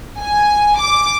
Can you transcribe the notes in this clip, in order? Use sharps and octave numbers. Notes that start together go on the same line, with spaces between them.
G#5
D6